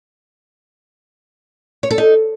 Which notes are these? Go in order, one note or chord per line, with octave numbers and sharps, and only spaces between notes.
C#5
A4
D#4